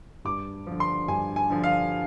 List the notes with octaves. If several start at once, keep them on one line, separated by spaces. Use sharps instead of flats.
G2 D6
D3 F3
C6
G2 G#5
G#5
D3 F3
F5